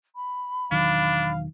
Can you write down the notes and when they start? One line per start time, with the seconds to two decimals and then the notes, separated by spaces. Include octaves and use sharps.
0.16 B5
0.71 E1 D#3 F#3 D4 F5